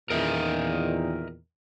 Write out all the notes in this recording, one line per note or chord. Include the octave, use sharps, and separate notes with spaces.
E2 A#2 D#3 A#4 D#5 E5